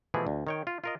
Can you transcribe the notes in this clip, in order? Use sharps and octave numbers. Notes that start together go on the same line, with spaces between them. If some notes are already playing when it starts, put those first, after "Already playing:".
B2 E3 F3 A3 E4 G#4
D2
D#3 C#5 G5
F4
F4 A#4 D#5